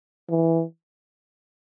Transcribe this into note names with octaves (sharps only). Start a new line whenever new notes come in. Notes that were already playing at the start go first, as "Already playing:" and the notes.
E3